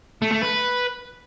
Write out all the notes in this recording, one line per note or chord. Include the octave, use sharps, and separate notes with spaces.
A3
A3
B4